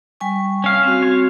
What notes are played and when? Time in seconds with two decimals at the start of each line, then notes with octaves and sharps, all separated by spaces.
0.21 G3 G#5 C#6
0.64 C#4 F5
0.83 C4 F#4
1.03 C#5